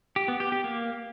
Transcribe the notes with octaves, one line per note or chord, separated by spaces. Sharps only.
G4
B3
G4
G4
A#3